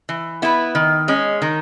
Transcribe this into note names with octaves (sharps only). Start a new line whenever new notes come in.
E3
B3 E4 B4
D#3
G#3 C#4
D#3